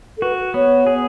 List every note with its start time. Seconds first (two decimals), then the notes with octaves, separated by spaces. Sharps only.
0.17 A4
0.22 F#4 B4
0.54 B3 C#5
0.87 G#4